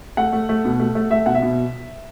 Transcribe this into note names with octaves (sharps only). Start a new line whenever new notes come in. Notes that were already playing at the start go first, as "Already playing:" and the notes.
A3 F#5
A3
A3
B2
A3
A3
A3 E5
B2 F#5
E5
B2